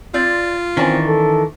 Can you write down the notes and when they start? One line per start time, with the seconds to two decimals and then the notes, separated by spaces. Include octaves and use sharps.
0.14 C4 F4 D5
0.77 D#3 E3 C4 C#4 D5 A5
1.08 A4